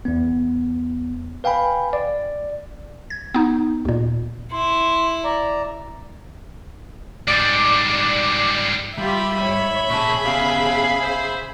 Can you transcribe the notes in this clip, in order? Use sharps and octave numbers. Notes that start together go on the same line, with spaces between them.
E2 B3
B4 F5 G5 G#5 B5
D5
G#6
B3 D#4
D#2 A#2
E4 C6
D5 A#5
G#2 G3 D5
G3 F4 G4 E5 B5
G#2 C#5
A#2 C#3 G#4 A5 C#6
B3 G4 F5
C5